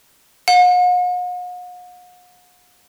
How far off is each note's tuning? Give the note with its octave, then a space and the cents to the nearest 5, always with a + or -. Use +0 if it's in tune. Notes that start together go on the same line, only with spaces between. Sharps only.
F#5 -45